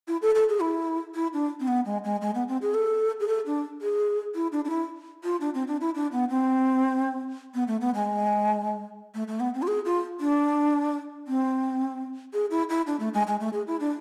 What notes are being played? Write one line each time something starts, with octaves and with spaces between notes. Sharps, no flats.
E4
A4
A4
G#4
E4
E4
D4
C4
B3
G#3
G#3
G#3
B3
C4
G#4
A4
G#4
A4
D4
G#4
E4
D4
D4
E4
F4
D4
C4
D4
E4
D4
B3
C4
B3
A3
B3
G#3
A3
A3
B3
C4
F4
G#4
F4
D4
C4
G#4
E4
E4
D4
A3
G#3
G#3
A3
G#4
E4
D4